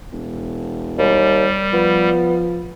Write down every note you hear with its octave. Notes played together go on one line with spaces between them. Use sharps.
E1
D#2 G3
F3 B3